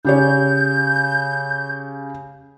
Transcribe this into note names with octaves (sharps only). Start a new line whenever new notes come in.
C#3 G4 C#5 G6